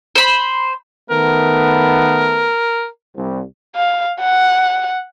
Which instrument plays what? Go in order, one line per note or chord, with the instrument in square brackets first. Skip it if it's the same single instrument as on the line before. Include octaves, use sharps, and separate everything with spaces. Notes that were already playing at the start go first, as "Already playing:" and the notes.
[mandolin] C5 B5
[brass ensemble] D#3 A3 B3 [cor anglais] A#4
[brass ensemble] C2
[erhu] F5
F#5